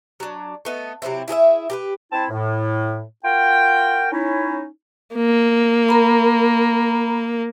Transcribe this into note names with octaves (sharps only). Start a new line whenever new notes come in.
F#3 D4
A3 B3 D#5
C3 F#3 C4 E4
E4 G#4 A#4 E5
G4 A#4 B4
C4 E4 A5
A2
F4 F#4 A#4 G5
C#4 D#4 E4
A#3
A#4 A#5 B5